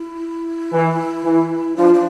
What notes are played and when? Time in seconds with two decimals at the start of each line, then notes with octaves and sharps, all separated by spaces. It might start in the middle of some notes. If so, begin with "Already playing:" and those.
Already playing: E4
0.73 E3
1.25 E3
1.76 F3 D4
1.94 D4